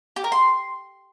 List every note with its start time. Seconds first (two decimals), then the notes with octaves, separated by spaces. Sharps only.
0.16 G4
0.24 A#4
0.32 C6